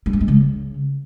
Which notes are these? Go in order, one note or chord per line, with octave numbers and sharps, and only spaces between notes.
G3
F3
G#3
C#3